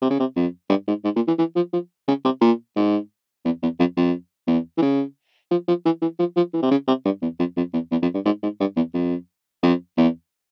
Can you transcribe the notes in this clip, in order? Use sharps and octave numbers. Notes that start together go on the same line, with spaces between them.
C3
C#3
C3
F2
G2
G#2
G#2
A#2
E3
E3
F3
F3
C#3
C3
A#2
G#2
E2
E2
F2
F2
E2
E3
C#3
F3
F3
E3
E3
F3
F3
E3
C3
C#3
C3
G2
E2
F2
F2
E2
E2
F2
G2
G#2
G#2
G2
E2
F2
F2
E2